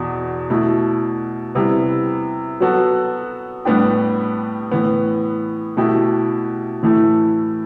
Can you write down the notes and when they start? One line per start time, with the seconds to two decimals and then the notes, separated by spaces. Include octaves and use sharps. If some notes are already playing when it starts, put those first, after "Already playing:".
Already playing: E2 B2
0.50 B2 A3 E4
1.55 C3 G3 B3 E4
2.60 F#3 B3 F#4 A4
3.65 A2 G3 B3 D4 G4
4.71 A2 E3 B3
5.77 B2 A3 E4 G4
6.83 A2 E3 A3 E4